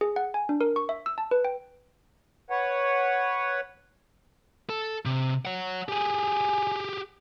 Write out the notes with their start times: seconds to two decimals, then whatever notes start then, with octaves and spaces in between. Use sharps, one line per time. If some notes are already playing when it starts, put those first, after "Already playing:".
0.01 G#4
0.16 F#5
0.34 G#5
0.49 D4
0.61 A#4
0.76 C#6
0.89 E5
1.06 E6
1.18 A5
1.31 B4
1.45 G5
2.50 B4 C#5 F#5
4.69 A4
5.05 C3
5.45 C#5 F#5
5.89 G4 G#4 G#5